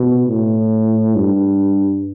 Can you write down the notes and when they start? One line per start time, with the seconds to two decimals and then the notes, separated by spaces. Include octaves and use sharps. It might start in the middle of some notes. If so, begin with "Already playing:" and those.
Already playing: B2
0.28 A2
1.16 G2